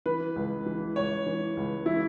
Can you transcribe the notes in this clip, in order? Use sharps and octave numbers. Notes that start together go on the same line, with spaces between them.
E3 B4
C#2
E3
C#2 C#5
E3
C#2
E3 E4